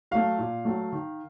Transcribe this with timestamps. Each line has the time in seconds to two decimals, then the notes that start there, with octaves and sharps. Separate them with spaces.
0.11 F#3 A3 F5
0.39 A#2
0.65 F#3 A3
0.92 D#3